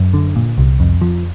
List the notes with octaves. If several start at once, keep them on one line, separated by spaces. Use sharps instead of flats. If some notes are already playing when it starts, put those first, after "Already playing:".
Already playing: F#2
D3
A#2
C2
F2
F3